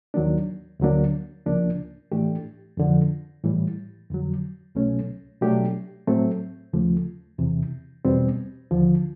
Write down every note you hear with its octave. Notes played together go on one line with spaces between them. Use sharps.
D#2 D#3 F#3 A#3 D4
D2 D3 F#3 A#3 D4
C#2 C#3 F3 A#3 D4
A2 E3 A3 D4 G4
F2 D3 F3
A2 E3 G3
F2 D3 F#3
C2 B2 F#3 A3 C#4
B2 F#3 A3 D4 G4
A2 F#3 A3 C4
D#2 C#3 F3 A3
E2 C3 E3
E2 B2 G3 C4
D#2 D3 F3